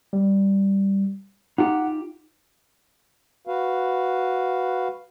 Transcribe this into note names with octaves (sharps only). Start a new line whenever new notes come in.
G3
D#4 F4 G4 F#5
F#4 B4 F5